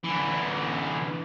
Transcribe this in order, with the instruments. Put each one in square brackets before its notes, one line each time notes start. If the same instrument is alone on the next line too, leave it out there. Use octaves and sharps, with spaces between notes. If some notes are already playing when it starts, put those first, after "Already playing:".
[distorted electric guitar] D3 E3